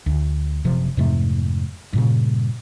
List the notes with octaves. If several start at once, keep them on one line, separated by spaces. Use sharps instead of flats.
D2
F#1 C3 F3
F2 G#2 C3 A3
G2 A#2 C#3